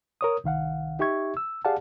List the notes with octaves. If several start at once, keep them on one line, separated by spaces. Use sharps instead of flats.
A#4 C#5 D#6
C2 D#3 F5 F#5
D#4 G4 E5 C#6 G#6
E6
G4 G#4 D5 F5 F#5 A5